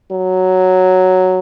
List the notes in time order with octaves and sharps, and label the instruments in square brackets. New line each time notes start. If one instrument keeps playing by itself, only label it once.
[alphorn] F#3